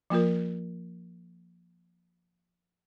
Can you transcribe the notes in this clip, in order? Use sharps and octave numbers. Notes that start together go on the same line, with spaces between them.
F3 A#3 F4 A#4